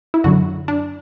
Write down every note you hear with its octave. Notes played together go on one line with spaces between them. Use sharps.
E4
F#2 D3 F#3 F#4
D4